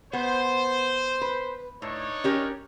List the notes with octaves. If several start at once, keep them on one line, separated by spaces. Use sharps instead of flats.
B3 C5
B4
A2 D4 D#4 C#5
C#4 G4 A#4